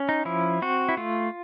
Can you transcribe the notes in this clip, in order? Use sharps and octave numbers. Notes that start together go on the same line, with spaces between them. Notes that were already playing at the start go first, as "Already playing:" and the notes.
Already playing: C#4
D#4
F3 E4
C4 F#4
E4
A3 F4